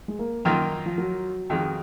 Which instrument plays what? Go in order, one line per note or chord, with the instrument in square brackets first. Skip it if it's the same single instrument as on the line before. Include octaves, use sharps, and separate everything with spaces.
[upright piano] G#3
A#3
[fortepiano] F#2 D#3 A#3 F4
[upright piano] F3
F#3
[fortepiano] F2 D#3 G#3